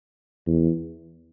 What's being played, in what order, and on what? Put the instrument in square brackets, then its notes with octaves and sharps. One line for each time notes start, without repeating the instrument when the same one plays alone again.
[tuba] E2